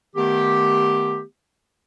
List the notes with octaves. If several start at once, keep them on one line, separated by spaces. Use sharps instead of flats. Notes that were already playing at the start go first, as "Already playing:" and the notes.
D#3 A3 B3 G4